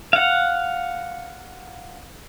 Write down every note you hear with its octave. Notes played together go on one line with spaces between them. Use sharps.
F5 F#5